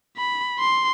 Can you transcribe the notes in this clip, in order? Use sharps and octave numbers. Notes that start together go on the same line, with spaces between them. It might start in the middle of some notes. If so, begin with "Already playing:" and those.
B5
C6